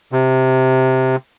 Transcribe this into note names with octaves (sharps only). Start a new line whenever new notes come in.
C3